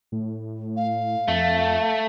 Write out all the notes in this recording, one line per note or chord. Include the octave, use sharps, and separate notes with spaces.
A2
F5
F2 A3